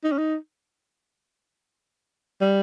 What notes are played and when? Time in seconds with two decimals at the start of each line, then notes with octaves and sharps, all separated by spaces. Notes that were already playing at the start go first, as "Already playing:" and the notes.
0.04 D#4
0.12 C#4
0.18 D#4
2.41 G3